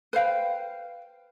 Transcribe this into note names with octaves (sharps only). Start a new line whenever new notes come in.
B4 C5 F5 G5